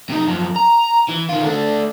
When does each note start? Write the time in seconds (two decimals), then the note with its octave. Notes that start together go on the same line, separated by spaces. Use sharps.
0.10 C3 D#4
0.26 F#2 F3
0.56 A#5
1.09 E3
1.29 D#3 F4
1.42 A3 D4